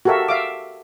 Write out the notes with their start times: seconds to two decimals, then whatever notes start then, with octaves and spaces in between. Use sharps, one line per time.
0.05 F#4 G4 A4 A#4 E5 F5
0.28 E5 F5 D6